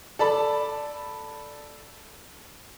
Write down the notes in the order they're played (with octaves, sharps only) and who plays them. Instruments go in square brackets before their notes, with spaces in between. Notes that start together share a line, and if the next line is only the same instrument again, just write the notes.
[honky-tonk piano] A4 D5 A5 B5